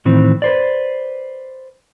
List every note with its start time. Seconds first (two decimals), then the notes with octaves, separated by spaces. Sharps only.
0.05 A2 D#3 E3 C4
0.42 B4 C5 D5